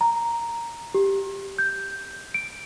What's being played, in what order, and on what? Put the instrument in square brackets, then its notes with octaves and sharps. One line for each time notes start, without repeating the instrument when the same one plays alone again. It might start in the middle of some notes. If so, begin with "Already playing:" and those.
[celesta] A#5
G4
G6
D7